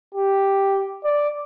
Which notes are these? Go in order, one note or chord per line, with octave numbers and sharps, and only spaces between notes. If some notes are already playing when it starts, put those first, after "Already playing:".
G4
D5